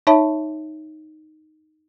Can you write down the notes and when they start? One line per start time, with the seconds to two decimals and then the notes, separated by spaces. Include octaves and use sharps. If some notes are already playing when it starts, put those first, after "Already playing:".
0.07 D#4 C#5 E5 A5 B5